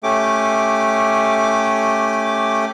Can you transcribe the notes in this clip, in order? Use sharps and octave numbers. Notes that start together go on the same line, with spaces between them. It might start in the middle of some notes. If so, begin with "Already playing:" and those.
A3 C#4 G4 D6